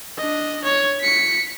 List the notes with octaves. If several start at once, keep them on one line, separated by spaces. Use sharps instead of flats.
D4 D#5
C#5
B6 C#7